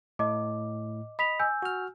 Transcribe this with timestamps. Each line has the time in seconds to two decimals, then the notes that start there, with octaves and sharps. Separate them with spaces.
0.19 A2 D#5 D6
1.19 D#5 B5 B6 F7
1.40 G#5 E6 G6
1.62 F#4 F6